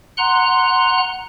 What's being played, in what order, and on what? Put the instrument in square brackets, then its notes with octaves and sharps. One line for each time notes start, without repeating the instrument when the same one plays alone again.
[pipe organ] F#5 A#5 C6 F#6